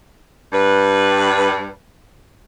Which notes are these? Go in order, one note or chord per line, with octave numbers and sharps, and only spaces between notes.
G2 B4